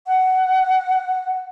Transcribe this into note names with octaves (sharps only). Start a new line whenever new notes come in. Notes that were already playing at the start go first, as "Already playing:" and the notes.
F#5